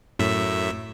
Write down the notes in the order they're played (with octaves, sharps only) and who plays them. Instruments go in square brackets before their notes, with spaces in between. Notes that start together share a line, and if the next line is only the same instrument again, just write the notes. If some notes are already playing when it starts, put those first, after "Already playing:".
[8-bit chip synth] F#2 A2 E5